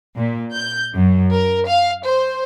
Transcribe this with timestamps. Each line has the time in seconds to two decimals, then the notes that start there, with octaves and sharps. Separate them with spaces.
0.18 A#2
0.54 G6
0.93 F#2
1.32 A#4
1.69 F5
2.04 C5